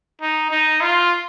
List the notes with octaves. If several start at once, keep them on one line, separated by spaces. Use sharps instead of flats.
D#4
D#4
F4